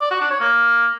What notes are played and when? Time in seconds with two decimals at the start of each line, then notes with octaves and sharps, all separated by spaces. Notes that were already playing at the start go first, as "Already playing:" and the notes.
0.01 D5
0.11 F#4
0.21 D4
0.31 C#5
0.41 A#3